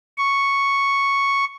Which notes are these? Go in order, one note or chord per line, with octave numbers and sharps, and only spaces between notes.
C#6